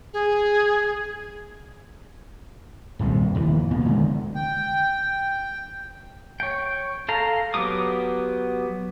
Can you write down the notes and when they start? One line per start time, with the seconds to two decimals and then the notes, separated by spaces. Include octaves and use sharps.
0.13 G#4
2.99 D#1 C2 C3
3.35 F1 D#2 E3
3.71 B2 A#3 B3
3.86 D3 G#3 A3
4.35 G5
6.40 C#5 G5
7.09 A4 F5 A#5
7.54 F#3 B3 G4 D6 D#6